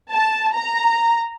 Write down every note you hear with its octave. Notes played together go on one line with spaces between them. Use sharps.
A5
A#5